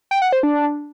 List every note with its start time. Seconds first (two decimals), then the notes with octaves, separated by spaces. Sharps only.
0.11 G5
0.22 F#5
0.32 C5
0.43 D4